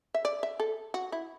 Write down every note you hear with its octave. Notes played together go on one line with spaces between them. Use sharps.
E5
D5
E5
A4
F#4
E4